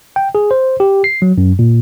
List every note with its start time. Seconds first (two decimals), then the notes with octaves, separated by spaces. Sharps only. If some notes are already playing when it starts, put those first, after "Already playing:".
0.16 G5
0.35 G#4
0.51 C5
0.80 G4
1.04 C7
1.22 F#3
1.38 F#2
1.59 A#2